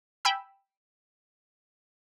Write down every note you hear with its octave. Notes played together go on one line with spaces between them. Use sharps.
G5 G#5 B5 E6